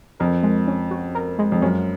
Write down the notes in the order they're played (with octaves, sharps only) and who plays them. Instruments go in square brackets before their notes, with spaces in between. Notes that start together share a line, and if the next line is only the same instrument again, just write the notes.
[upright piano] F2 [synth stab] A#4
[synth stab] G#3
C#4
F#4
A#4
G#3
[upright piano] F2
[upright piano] F#2 [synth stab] C#4